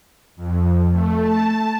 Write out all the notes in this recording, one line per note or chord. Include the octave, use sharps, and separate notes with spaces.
F2
A3
A5